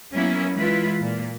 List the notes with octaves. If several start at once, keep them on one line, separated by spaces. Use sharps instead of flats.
F#3 A#3 B3 C#4 E4
E3 G#3 E4 F4 B4
A#2